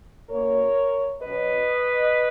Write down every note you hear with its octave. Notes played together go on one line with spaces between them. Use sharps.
B2 A#3 C#4 A#4 C#5
B2 F#3 C#4 B4 D#5